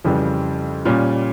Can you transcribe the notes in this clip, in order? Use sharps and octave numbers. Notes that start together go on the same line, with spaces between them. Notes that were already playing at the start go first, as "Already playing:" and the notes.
F2 C#3 E3 G3
A#2 G3 C#4